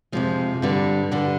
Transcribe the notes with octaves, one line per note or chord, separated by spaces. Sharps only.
F2 C3 F3 G#3
G2 D3 G3
G2 D3 G3